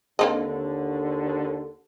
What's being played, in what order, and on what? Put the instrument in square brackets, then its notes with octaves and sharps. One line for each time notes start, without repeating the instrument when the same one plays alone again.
[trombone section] D#2 D3 [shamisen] A#3 C4 D#5